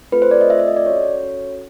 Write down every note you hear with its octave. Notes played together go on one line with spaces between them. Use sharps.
A3 C4 F4 A4 B4
C5
D5
D#5
A3 C4 F4 A4 E5
E5
D#5
D5
C#4 F#4 A4 C#5
C#4 F#4 A4